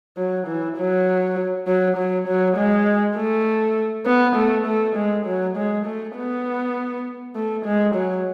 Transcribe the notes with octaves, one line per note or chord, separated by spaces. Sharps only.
F#3
E3
F#3
F#3
F#3
F#3
G#3
A3
B3
A3
A3
G#3
F#3
G#3
A3
B3
A3
G#3
F#3